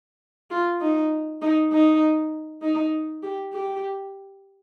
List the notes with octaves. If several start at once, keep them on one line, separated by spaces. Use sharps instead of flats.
F4
D#4
D#4
D#4
D#4
G4
G4